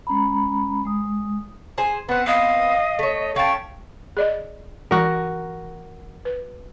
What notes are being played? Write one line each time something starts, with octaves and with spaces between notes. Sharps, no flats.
G#3 C#4 A#5 B5
G#3 D#6
G#4 C5 G#5
B3 C4 B4 F#5
D#5 F5 D#6
A3 C#5
C#4 F5 G5 A5 C#6
G#4 D5 D#5
E3 F#4 A#4
B4